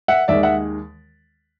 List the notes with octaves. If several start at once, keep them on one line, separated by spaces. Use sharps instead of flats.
E5 F#5
D#2 D#3 G#3 D5 E5
E5 F#5